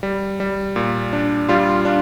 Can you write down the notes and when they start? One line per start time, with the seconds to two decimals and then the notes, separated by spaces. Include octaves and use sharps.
0.03 G3
0.40 G3
0.76 A#2
1.13 D4
1.48 G3 F4
1.85 D4